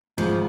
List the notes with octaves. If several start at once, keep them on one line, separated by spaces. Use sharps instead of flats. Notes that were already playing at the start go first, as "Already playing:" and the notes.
G#1 G#2 F3 G#3